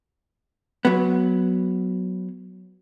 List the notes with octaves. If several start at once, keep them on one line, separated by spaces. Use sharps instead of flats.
F#3 B3